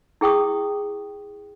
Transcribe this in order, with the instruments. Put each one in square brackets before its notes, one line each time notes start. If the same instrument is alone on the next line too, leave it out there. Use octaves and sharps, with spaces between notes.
[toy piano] E4 G#4 G5 C#6 D#6